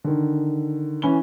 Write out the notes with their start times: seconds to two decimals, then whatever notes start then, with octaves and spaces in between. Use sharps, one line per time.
0.04 D3 D#3
1.02 E3 C#4 B5 G7